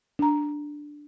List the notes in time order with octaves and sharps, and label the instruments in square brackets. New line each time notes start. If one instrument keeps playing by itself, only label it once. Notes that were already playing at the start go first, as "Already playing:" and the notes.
[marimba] D4 A#5